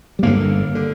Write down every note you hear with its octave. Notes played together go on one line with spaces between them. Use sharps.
G3
G1 G2 D3 A#3
D3